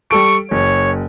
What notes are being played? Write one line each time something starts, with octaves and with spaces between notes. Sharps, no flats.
G3 A4 C#6 D7
F#1 C#5